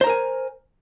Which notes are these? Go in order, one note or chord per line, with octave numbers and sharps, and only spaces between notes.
A#4 C5 G#5 A#5